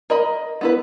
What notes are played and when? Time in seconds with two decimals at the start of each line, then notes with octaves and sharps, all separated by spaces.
0.10 A#4 D#5 B5
0.61 B3 E4 B4